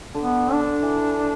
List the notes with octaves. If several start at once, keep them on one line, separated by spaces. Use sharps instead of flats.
D3
B3
D4
D3
E3